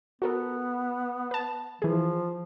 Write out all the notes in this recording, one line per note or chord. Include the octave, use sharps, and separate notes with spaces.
B3 F#4 A4 A#4
B4 A5
E3 F3 G#4